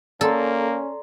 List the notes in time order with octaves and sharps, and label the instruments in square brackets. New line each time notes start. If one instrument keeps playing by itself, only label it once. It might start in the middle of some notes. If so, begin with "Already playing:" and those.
[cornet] A#3 [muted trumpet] C#4 [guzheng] A4 [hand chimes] D5 A#5 C6